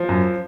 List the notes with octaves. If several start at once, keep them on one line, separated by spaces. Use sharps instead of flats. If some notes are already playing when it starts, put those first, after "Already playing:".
Already playing: F3
F#2